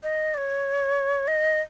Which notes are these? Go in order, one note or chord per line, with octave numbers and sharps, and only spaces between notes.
D#5
D5
C#5
D#5